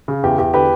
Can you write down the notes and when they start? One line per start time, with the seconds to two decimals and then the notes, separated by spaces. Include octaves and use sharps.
0.08 C#3
0.23 E2 G4
0.38 E2 G4
0.54 D3 G4 B4